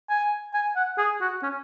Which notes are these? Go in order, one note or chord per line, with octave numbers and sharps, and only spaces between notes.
G#5
G#5
F#5
G#4
F#4
C#4